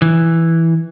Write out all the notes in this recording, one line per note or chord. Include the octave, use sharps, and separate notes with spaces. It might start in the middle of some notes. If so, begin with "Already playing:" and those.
E3